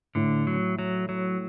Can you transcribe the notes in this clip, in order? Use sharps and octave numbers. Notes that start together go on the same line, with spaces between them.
A2 D3
F#3
F#3
F#3